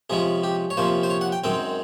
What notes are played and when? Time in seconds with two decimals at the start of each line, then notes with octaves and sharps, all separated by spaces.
0.10 C3 F3 G#3 C#4 G#4
0.44 G4
0.70 C#5
0.77 C3 F3 A#3 C#4 C5
1.03 C5
1.10 C#5
1.21 F#5
1.32 G5
1.44 F#2 D#3 G#3 C4 G5